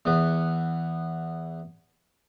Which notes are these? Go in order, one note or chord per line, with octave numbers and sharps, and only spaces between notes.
E2 B3